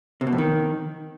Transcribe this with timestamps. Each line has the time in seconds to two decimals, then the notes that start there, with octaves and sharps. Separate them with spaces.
0.21 C3
0.27 B2
0.33 F2
0.38 D#3